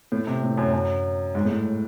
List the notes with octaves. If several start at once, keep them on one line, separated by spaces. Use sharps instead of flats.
A2
C3
A2
F#2
F#2
G#2
A2